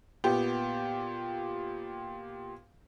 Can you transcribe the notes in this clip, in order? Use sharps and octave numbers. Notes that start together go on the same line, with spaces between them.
A#2 B3 G4